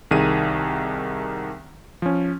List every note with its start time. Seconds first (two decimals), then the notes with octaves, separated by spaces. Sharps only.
0.11 C2 D#3 G#4 D#7
2.02 F3 C#4